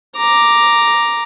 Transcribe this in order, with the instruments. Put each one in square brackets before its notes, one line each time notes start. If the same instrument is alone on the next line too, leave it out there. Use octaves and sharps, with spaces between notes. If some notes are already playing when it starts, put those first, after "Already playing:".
[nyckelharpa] A#5 D6